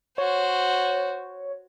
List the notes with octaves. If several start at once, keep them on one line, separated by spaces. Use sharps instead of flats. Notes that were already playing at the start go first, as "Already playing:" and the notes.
F#4 C5 C#5